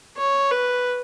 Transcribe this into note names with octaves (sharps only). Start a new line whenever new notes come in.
C#5
B4